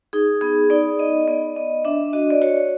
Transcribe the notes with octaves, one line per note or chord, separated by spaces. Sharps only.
D#4 G#4
B3 G#4
D#4 D5
B3 D#5
B3 D5
B3 D#5
D4 E5
F#4 D#5
D5
F#4 C#5